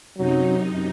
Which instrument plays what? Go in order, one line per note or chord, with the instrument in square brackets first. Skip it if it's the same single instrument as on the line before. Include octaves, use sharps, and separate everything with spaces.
[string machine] F#2 C3 D#4 [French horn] F#3